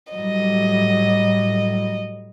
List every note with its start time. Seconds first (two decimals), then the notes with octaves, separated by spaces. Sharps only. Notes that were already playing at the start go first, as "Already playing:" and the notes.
0.13 A2 F#3 G3 D#5